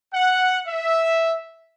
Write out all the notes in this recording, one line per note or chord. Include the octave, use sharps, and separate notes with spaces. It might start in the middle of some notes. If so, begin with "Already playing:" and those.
F#5
E5